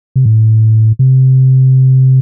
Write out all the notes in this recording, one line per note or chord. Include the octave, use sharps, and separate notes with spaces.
C3
A2
C3